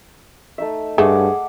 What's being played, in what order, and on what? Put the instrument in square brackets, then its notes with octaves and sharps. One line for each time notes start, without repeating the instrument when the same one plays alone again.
[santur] A3 D#4 E5
[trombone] G2 [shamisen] A3 [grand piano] G#4 [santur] F#5 D6